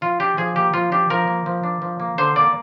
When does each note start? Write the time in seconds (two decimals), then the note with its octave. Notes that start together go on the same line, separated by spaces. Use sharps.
0.01 F3 F4
0.20 D4 G4
0.37 F3 G#4
0.56 A#3 G4
0.73 F3 F4
0.92 D4 G4
1.10 F3 A#4
1.28 A#3
1.46 F3
1.63 D4
1.82 F3
2.00 A#3
2.18 D3 C5
2.36 A#3 D5